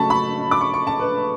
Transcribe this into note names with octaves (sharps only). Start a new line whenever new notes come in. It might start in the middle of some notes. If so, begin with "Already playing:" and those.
Already playing: C#3 F#3 A3 A5 B5 C#6
B5
D6
C#6
C#6
A5
B4